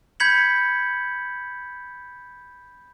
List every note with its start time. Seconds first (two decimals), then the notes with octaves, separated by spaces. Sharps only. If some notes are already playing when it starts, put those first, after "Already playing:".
0.20 B5 G6 G#6 B6 C#7 F#7